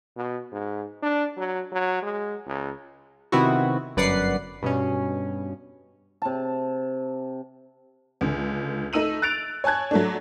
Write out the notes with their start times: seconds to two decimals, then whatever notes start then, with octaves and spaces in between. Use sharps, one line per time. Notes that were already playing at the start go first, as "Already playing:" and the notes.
0.16 B2
0.52 G#2
1.03 D4
1.37 F#3
1.72 F#3
2.02 G#3
2.46 C#2
3.32 C3 D#3 B3 C4 E4 F#4
3.97 G1 F#2 B4 D5 F#5 C7
4.62 G2 B2 C#4
6.22 C3 A5
8.21 C#2 D3
8.93 A3 D#4 E6 D#7 F#7
9.22 F#6 A6 D7 F7
9.64 C#5 G#5 A5 F#6 G#6
9.91 F#3 A3 D4